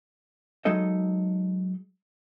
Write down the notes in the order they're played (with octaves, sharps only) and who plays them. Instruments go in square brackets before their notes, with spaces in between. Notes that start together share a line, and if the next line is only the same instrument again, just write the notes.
[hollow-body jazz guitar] F#3 G#3 D#4 A4 D#5